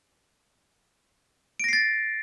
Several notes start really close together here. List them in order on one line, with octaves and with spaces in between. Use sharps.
D7 A#6 C7 A6